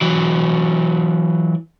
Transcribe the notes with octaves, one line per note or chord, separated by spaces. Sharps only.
E3 F#3